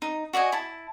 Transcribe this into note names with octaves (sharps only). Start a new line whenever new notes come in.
D#4
F#4 D5 D#5 G#5
E4 A5